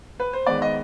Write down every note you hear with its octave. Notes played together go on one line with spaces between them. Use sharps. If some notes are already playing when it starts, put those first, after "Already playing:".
B4
C5
D#3 G#3 B3 D5
D#5